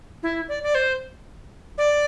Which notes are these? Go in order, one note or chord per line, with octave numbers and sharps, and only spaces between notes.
E4
D5
D5
C5
D5